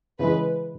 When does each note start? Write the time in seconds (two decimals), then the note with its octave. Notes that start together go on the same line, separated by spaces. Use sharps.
0.19 C#3 E3 G#3 B4